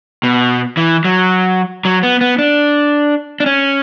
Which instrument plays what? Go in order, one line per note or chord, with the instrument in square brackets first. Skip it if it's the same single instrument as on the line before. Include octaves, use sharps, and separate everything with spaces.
[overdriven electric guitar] B2
E3
F#3
F#3
B3
B3
D4
D4
C#4